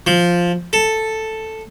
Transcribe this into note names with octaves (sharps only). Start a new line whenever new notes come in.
F3
A4